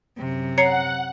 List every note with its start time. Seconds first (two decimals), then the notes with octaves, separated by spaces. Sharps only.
0.18 F#2 C3
0.58 C#5 F#5 A#5 C7 C#7